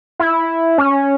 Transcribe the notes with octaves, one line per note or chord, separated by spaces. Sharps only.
E4
C#4